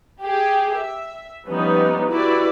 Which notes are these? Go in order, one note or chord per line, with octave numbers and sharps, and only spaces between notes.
G4 G#4
E5
F3 G3 B3 C#4 D#4
E4 F#4 G4 B4 D5